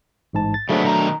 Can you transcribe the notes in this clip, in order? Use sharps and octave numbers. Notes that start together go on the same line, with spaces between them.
A1 G#2 A5
A6
C#3 F3 F#3 A3 B3 D4
B2 D#3 A#5